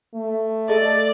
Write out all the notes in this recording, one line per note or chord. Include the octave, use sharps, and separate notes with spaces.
A3
A4 D5 D#5